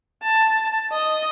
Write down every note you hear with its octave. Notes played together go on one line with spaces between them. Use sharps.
A5
D#5